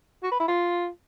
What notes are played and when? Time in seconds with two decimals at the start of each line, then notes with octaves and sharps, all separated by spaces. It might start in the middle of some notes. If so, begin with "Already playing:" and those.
0.23 F#4
0.31 B4
0.40 E4
0.48 F4